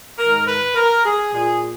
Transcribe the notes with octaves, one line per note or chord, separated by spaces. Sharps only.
G#2 D#3 A#4
B4
A#4
G#4
A#2 G#4